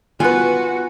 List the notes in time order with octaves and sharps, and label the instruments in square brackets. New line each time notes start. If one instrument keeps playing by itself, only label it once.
[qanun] B3 F4 [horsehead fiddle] F#4 [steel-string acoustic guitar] B4 G#5